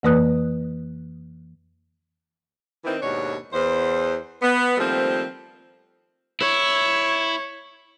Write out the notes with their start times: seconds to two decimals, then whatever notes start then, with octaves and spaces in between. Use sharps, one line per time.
0.03 F2 E3 A#3 B4 D#6 F#6
2.85 D#3 E3 C4
3.02 D#2 G#2 B2 D4 C#5
3.53 E2 C5
4.42 B3
4.78 D#3 F3 G3 A3 A#3 C4
6.41 E4 C#5